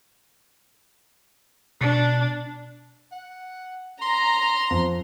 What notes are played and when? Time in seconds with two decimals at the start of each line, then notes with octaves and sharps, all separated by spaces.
1.81 B2 D4
3.12 F#5
4.02 A#5 C6
4.70 F2